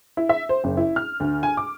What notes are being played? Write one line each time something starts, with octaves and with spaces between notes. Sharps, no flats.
E4
E5
C5
F#1
E4
F6
D2
G#5
D6